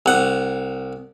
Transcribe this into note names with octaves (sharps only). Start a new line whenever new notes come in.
C2 F#5